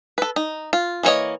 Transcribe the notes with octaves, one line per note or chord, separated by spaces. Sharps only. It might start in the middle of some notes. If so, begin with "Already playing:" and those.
A4 B4
D#4
F4
E3 A#3 C#4 C#5 D#5